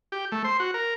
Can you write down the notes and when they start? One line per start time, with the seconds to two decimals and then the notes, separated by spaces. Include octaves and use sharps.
0.12 G4
0.32 A3
0.44 C5
0.60 F#4
0.74 A#4